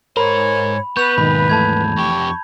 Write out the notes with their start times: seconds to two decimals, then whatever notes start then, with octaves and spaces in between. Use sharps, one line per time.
0.17 G#2 A#4 C5 C#5 B5
0.97 B3 B4 C#6 G6 F7
1.18 D#2 G#2 B2 D#3 B5
1.49 E3 A3 A5 B5 G#6
1.97 F2 G4 C#6